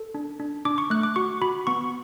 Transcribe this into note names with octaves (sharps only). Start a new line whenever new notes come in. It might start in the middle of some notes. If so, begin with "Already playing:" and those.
Already playing: A4
D4
D4
D4 D6
C#6
A3 F#6
D6
F#4 C#6
F#4 B5
B3 C#6